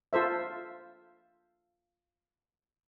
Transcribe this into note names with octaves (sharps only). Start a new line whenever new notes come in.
F4 A4 C5 E5